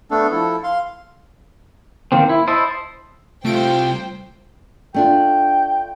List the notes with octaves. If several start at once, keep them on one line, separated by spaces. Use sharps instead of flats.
A3 B3 D4 A4
F3 E4 A4
F5 C6
D#3 A#3 C4
E4
E4 C5 D#5 E5 A5
C3 G3 A3 F4 C5 G5 D7
A3 D4 F4 G5